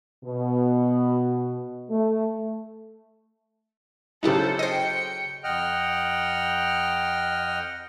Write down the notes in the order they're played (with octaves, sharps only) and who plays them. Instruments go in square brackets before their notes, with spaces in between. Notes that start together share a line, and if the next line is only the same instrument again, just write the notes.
[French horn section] B2
A3
[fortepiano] C#3 F#3 [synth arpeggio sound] D#4 E4 G4 [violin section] A4 C5
[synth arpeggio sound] C5 D#5 [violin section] G5 C#7
[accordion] F2 D#5 F#5 G5 F6